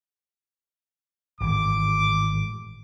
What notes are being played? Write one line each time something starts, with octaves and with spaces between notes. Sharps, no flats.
G#1 A2 E3 D6